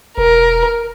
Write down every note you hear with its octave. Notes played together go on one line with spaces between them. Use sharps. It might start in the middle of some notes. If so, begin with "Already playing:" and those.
E1 A#4